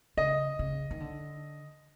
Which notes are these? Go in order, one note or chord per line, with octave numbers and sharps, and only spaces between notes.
C#3 D#5
C#3
D#3
D3